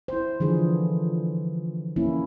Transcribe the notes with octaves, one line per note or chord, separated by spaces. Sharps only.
E4 C5
D3 E3 F3 G#4
A#3 C#4 E4